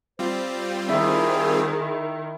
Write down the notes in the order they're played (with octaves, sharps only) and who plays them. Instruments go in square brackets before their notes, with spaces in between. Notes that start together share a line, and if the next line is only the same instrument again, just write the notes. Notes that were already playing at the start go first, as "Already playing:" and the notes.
[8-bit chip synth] G3 C4 F4 [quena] C5
[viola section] D#3 [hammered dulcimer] E4 [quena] G#4